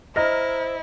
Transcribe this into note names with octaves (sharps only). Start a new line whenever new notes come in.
E4 C5 D#5 A#5 F6 A#6